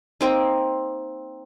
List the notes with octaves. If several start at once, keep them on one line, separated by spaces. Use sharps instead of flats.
A#3 C4 D#4